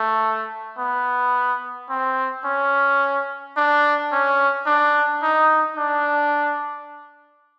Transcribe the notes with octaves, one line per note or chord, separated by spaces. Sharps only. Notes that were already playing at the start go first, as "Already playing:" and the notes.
Already playing: A3
B3
C4
C#4
D4
C#4
D4
D#4
D4